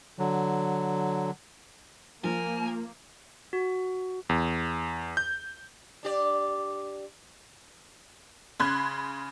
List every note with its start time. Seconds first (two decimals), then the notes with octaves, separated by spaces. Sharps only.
0.19 D3 F#3
2.24 F3 A#3 A#4 G#5
3.53 F#4
4.29 E2
5.17 G6
6.03 D4 G4 D5
8.60 C#3 B5 C6 F#6 G#6